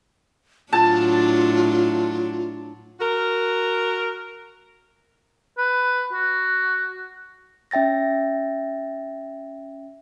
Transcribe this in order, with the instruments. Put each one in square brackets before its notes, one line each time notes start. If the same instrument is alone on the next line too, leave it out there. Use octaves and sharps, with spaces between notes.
[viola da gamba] A2 F#3 D4 [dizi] F4 [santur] A5
[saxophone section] F#4 A#4
[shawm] B4
F#4
[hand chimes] C#4 E5 G5 A6 A#6